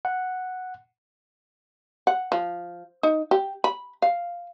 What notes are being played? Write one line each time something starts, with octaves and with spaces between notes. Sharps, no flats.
F#5
F#5
F3
D#4
G4
B5
F5